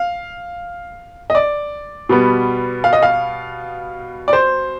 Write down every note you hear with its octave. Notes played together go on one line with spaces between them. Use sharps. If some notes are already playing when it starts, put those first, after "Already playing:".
Already playing: F5
D#5
D5
B2 G3 B3
F5
D#5
F5
D5
C5